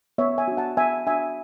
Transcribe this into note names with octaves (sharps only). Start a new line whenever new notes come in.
B3 C#5 E5
E5 G#5
D4 F#4
F#5 A5
B3 E5 G#5
D4 F#4 E5 G#5